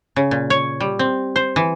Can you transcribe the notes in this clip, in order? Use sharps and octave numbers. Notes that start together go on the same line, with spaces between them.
C#3
A#2
C#5
G3
C4
C5
E3